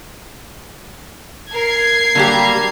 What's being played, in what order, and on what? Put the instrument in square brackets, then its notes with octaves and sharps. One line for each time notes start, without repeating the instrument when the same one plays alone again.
[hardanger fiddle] A#4 [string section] G#6 C7
[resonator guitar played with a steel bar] D3 F#3 G4 [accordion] G3 A#3 [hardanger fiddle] A#5